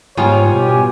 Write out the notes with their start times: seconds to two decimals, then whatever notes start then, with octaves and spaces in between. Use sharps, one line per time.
0.17 G#2 G3 B3 F4 C#5 G#5
0.54 B2 G4